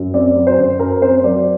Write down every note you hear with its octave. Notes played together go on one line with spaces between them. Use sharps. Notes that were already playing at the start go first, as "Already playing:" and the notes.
Already playing: F#2
C4 D5
F#3
C5
F#2
F#2 A#4
C4 C5
F#3 D5